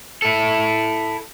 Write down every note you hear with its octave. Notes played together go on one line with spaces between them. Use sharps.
E4 A4